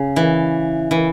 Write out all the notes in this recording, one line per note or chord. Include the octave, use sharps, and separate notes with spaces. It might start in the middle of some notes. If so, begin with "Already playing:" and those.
Already playing: C#3
E3
E3